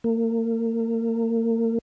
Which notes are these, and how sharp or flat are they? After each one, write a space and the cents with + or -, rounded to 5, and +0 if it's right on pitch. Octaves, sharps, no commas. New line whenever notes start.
A#3 -35